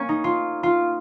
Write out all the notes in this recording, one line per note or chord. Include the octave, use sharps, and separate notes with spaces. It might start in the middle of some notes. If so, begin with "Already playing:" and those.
Already playing: A#3 C#4
D#4
F4
F4